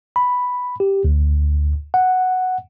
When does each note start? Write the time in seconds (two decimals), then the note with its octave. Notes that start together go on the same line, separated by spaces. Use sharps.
0.16 B5
0.80 G4
1.04 D2
1.94 F#5